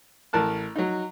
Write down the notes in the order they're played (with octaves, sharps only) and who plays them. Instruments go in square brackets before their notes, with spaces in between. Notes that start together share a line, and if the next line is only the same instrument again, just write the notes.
[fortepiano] A1 A#4 A5 F#6
F#3 D#4